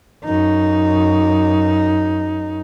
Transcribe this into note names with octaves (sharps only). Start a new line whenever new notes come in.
F#2 D#4